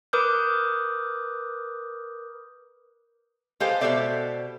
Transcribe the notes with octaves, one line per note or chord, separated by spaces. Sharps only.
A#4 B4 D6 D#6 F#6 G6
G#3 G4 A4 B4 C5 F5
B2 G4 A4 C5 D5 E5